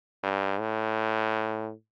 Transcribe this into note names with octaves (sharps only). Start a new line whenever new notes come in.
G2
A2